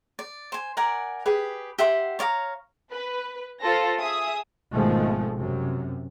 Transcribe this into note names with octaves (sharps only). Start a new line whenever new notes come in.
D5
C5 G#5
A#4 D5 F#5 G#5
G4 G#4 B4
G4 E5 F#5 C6
C#5 D5 F5 A#5
B4
F4 A4 C5 A#6
G#4 E5 D#6
G#1 B2 D#3 F3 G#3 A3
F#2 C3